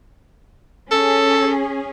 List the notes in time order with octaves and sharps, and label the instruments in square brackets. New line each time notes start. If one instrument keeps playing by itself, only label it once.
[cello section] C#4 G#4 [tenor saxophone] A4